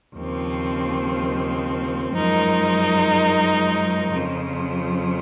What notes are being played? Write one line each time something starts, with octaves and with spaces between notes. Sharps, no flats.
D#2 C#3 F3 C4
F#2 F3 G#3 D#4 A#4
F2 C#3 F3